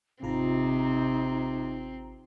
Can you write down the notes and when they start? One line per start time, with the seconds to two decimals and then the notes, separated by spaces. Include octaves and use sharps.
0.23 G#1 C3 C4 D#4 F4 A#5